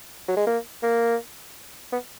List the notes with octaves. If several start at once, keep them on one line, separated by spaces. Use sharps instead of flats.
F#3
G#3
A#3
A#3
B3